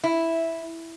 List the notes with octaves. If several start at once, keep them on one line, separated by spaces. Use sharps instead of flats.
E4